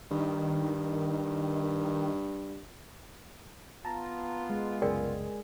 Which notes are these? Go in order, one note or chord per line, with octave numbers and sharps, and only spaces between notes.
G2 D#3
B3 F4 A5 A#5
G#3
C2 F#2 C#3 G#4 A#4 D5 G5